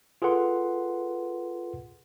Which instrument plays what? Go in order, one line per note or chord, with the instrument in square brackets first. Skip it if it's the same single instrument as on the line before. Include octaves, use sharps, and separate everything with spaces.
[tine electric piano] F4 G#4 A4 B4 F#5 C6